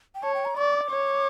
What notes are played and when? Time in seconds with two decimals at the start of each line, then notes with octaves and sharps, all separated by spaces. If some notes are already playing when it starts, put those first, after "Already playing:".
0.15 G5
0.23 C#5 A5
0.34 G5
0.45 A#5
0.57 D5 C#6
0.73 D6
0.91 C#5